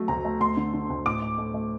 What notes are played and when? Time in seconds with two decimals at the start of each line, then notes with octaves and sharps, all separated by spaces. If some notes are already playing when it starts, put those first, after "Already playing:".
Already playing: F#3 A3
0.08 D2 A#5
0.25 A3
0.40 D2 C6
0.57 D3
0.74 D3
0.90 D2
1.06 A2 D6
1.22 A3
1.38 A3
1.54 A3